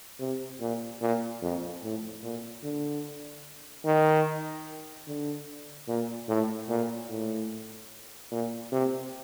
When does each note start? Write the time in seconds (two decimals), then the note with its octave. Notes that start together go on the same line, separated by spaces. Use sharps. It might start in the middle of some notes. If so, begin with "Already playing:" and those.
0.20 C3
0.60 A#2
1.01 A#2
1.42 F2
1.83 A2
2.23 A#2
2.63 D3
3.85 D#3
5.07 D3
5.88 A#2
6.29 A2
6.69 A#2
7.09 A2
8.32 A#2
8.72 C3